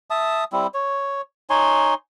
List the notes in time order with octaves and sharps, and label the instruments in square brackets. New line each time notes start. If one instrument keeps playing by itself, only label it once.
[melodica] E5 A5 D#6
G3 C4 E4
C#5
D#4 C#5 G#5 C6